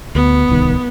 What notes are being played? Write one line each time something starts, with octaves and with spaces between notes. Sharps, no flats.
D2 B3
D1 C2 D#3